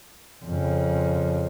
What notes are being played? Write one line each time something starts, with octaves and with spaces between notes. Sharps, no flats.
F2 C#3